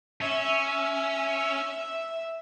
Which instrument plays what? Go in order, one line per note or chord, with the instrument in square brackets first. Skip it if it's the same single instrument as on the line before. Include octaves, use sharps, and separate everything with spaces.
[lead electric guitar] C#4 [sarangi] E5